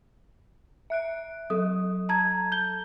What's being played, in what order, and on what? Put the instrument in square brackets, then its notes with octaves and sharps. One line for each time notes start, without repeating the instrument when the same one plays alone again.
[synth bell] E5 F#6 D7
[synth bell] F#3 A4 [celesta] D#6
[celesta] A5 A#5 G#6
G6 G7